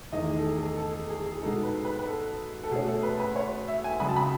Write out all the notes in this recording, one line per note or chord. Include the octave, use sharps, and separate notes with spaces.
E2 D#3 A3 D#5
G#4
A4
G#4
A4
G#4
A4
A4
G#4
G#4
B2 G#3 D#4 A4
B4
B4
B4
A4
A4
B2 A3 C#4 G#4
A4
B4
B4
C#5
E5
G#5
C#2 C#3 F#3 B5
A5
B5